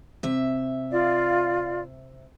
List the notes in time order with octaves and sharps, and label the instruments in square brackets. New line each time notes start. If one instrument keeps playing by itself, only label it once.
[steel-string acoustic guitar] C3 E5
[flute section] F4 D5 F5